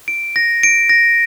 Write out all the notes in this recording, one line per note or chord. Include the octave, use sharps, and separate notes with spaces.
D7
A#6
D7
A#6